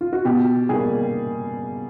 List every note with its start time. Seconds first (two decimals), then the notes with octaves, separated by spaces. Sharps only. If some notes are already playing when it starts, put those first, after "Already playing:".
0.01 F4
0.13 F#4
0.25 B2 G4
0.69 G3 A#3 G#4